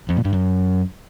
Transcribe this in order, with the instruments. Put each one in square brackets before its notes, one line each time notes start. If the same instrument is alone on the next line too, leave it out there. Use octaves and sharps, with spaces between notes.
[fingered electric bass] F2
A#2
G2
F#2